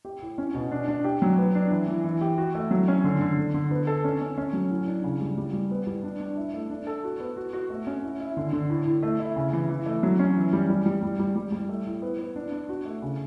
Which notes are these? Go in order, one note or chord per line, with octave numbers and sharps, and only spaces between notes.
G4
A2
C#4
B2
D4
D4
G4
F#3
B3
D4
E3
E3
E3
G4
F#4
A3
F#3
C#4
D3
D3
D3
D3
B3
A4
C#4
C#4
C#4
F#3
A2
D4
C#3
G3
G3
G3
B3
G3
D4
D4
E4
A3
D4
A4
F#4
B3
F#4
F#4
A3
C#4
E4
E4
D3
D3
A2
A2
A3
E4
C#3
E3
E3
A3
F#3
C#4
E3
G3
G3
G3
G3
G3
G3
G3
A3
A2
B3
B3
D4
D4
F#4
A3
C#3